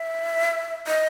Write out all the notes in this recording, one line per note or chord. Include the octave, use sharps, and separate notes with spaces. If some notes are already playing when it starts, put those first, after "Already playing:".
Already playing: E5
D#5